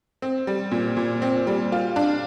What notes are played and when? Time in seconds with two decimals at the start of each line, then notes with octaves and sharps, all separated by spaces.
0.22 C4
0.47 G3
0.71 A#2
0.97 A#2
1.22 C4
1.47 G3
1.72 F4
1.96 D4